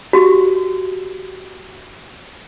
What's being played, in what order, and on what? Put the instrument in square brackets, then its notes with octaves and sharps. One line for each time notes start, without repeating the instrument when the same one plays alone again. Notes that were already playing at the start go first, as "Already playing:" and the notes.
[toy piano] F#4 G4